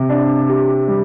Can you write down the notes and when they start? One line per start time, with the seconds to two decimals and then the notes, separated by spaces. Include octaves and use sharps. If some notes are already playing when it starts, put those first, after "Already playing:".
Already playing: C3
0.09 D4
0.49 G4
0.88 G3